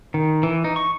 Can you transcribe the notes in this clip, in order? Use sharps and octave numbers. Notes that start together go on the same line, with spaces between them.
D#3
E3
D#4
C#6